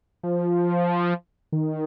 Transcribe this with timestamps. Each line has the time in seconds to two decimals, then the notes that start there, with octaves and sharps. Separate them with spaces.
0.23 F3
1.52 D#3